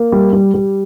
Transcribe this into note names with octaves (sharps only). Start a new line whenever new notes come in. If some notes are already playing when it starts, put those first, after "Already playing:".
Already playing: A#3
G3
G3
G3